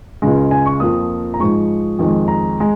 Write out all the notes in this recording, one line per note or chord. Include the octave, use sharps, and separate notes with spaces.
C#2 C#3 G#3
G#5
C#6
F2 F3 A#3 D#6
A#5
G#2 F3 G#3 C#6
F2 D#3 G#3
A#5
G#3